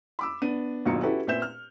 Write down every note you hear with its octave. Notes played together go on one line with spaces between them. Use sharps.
B5 D6 E6
B3 D4 D#7
G1 D#2 B2 F#3 F4 C#7
C#4 E4 F#4 G4 A4 B4
A#2 C4 B4 E5 G6 E7
F6